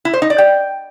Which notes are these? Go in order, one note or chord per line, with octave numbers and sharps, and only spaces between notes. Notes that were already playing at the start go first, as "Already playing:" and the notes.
E4
C5
D#4
D5
G5